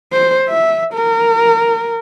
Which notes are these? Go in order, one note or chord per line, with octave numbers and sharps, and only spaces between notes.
C5
E5
A#4